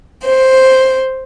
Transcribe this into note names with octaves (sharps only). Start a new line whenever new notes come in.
C5